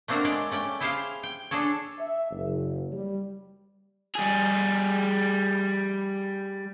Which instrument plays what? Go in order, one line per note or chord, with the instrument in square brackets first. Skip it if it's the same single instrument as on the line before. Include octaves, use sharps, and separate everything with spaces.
[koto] A3 A#3 C4 D4 F#4 A#4
G#3 C#5 D5
A3 C#4 D5 G5
E4 G4 G#4 C5 C#5 F5
G5
D4 G#4 A4 C#5
[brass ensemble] E5
F#1
G3
[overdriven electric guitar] G3 G#4